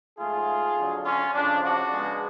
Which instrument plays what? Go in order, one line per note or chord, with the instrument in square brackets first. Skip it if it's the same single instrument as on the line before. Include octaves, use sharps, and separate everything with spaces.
[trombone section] G#2 F3 A3 F4 G#4
F2 D3 F#3
C#4 F4
F2 C#3 F3 D4
D4 F#4
C#3 G#3 B3